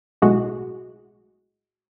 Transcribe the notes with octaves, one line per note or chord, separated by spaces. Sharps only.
B1 A2 G#3 F#4